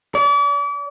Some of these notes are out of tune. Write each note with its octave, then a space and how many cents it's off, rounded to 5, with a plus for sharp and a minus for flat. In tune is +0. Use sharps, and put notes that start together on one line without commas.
D5 -40